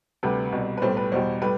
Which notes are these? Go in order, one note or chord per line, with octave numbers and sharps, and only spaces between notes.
D2 C3 G3 B4
C2 B2 G3
B4
B1 A2 G3 C5
B4
E2 B2 G3 C5
A2 G3 B4